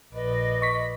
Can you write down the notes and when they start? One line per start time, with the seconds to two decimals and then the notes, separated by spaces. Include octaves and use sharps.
0.14 A#1 B4 D5 D#5
0.62 C#6 B6